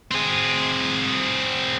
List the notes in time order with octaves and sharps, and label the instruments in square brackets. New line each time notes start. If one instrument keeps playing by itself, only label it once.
[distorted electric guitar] C4 G#4